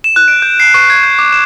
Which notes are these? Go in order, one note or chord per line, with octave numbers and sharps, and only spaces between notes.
E7
F#6
D7
G6
C7
C#6
G#6
G6
D6
E7